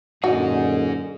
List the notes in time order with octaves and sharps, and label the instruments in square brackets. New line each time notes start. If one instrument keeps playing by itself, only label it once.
[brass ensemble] F#2 A#2 D3 [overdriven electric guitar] D#4 G#4 [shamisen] F#4